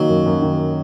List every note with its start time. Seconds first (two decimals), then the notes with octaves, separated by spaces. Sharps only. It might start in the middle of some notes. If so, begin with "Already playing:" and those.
Already playing: D#3 F#3 A#3 D#4
0.09 F#2
0.26 F#2
0.42 D#3